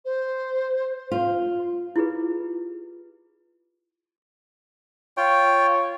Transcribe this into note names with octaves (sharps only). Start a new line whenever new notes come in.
C5
F4
E4 F4 G4 G#4 B4
F4 C#5 G5